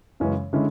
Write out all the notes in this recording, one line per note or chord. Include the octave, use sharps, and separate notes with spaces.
F#2 C#3 E3 G#3 C#4
D3 G#3 C#4 E4